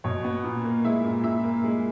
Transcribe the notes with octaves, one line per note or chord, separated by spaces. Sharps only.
B2 C#5
B3
A#2
A#3
G#3 E4 E5
A#2
A#2 E4 E5
A#3
G#3